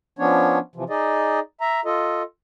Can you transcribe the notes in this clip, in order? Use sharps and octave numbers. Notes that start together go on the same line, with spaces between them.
F3 B3 C#4 D4 C#5
C3 E3 F3
D#4 G#4 D5 D#5
E5 A#5
F4 A4 D#5